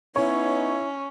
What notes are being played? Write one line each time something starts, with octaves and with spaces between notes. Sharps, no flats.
B3 C#4 D#4 E4 C#5